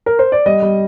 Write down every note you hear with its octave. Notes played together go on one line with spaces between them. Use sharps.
A#4
C5
D5
G3 D#5
G3